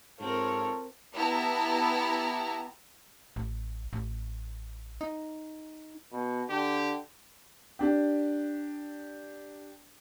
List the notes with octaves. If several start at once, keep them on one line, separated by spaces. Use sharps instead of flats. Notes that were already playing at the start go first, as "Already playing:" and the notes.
G#2 C4 F4 A4 A#4 C#5
B3 E4 G4 A5 A#5
A1
A1
D#4
B2
D3 G4
D4 G4